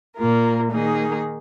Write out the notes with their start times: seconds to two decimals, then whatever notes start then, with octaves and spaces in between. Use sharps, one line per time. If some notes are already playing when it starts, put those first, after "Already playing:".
0.17 A#2 A#3 F4 A#4
0.70 D#3 A#3 D#4 G#4